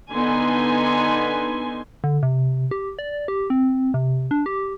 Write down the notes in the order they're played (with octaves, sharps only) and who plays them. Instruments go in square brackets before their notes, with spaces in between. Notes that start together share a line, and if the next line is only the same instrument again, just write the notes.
[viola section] D3 B3 D#4 G#5 C6
[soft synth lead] D3
C3
G4
D5
G4
C4
C3
D4
G4